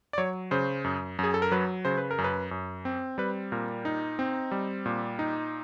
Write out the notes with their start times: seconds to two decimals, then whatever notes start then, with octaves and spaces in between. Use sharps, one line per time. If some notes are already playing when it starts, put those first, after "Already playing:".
0.13 D5
0.18 F#3 C#5
0.51 C#3 C5
0.84 F#2
1.19 F#2 G#4
1.34 A4
1.42 A#4
1.52 F#3 B4
1.85 C#3 C5
1.98 B4
2.11 A#4
2.18 F#2
2.24 B4
2.51 F#2
2.85 C4
3.18 G3 B4
3.52 A#2 A#4
3.85 D#4
4.19 C4
4.51 G3
4.86 A#2
5.19 D#4